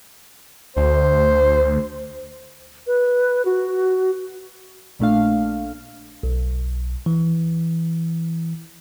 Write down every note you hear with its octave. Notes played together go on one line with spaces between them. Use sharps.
D2 C5
B4
F#4
A#1 A#2 A3 D4 F5
B1
E3